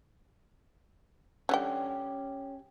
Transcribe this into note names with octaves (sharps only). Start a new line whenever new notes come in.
D3 G3 C#4 G4 G5